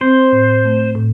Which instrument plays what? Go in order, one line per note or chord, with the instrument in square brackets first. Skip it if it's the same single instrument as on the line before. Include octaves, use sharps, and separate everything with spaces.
[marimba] C4 [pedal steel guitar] C5
[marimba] A2
A3
A2